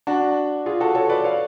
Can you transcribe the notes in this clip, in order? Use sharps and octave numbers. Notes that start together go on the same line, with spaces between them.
D4 F#4
F4 G#4
F#4 A4
A4 C#5
B4 D5
C#5 F5